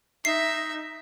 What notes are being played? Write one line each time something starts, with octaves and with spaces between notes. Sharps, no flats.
D#4 E5 C7